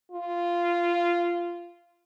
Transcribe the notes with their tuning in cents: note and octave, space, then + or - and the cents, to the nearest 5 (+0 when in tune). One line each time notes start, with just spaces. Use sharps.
F4 -10